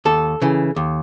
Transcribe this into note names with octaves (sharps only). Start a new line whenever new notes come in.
D#2 A4
C#3 E3
D#2